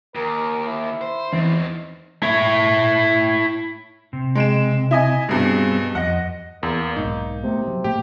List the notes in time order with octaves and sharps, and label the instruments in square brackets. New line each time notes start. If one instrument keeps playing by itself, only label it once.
[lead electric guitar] D#2 [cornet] A#4
[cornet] E4
[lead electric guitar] C5
[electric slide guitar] E2 [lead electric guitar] C4 D#4
[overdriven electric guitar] E4 C#5
[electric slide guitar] C3
[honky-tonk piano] G#3 D7 E7
E4 D#5 G#5
[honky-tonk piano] G2 B2 [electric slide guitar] G3 C4 G#4
[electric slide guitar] F2 D#5 [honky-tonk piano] F#5
[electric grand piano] E2 [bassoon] A#3
[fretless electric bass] B1 G#2 [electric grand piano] D#4
[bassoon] C3 [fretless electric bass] A3 B3
[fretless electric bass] F#3
[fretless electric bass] A2 A#3 [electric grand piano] G4